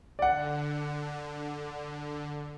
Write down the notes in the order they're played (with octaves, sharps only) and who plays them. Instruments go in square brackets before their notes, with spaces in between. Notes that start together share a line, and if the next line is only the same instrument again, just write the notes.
[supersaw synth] D3 [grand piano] D5 F#5